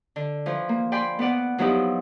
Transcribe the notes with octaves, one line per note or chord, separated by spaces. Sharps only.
D3
E3 F3
A#3
D5 G5 G#5 B5 C6
B3 B4 D5 F#5
F3 F#3 B3 D#4 E4 G4